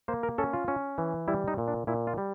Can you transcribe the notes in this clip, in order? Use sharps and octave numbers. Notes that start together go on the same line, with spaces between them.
A#3 C5
A#4
C#4 A4
F4
C#4
E3
G3 E4
D#4
A#2
D4
A#2 E4
F4
G3